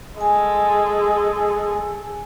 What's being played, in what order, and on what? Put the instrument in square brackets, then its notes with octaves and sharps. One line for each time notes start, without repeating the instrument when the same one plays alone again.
[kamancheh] G#3 [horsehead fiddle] G#4 A4 [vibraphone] G#5